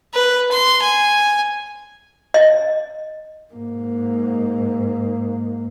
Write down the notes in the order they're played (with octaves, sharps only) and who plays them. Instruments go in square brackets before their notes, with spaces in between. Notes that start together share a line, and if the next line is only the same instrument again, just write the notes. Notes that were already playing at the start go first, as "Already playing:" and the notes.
[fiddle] B4
C6
G#5
[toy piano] D#5
[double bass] G#2 A#3